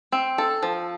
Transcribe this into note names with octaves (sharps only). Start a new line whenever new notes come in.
C4
A4
F3